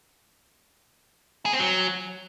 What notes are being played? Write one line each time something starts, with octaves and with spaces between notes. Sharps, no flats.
G#4
C4
F#3